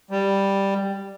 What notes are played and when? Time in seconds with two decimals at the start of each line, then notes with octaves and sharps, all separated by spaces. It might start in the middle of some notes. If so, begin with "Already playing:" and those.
0.11 G3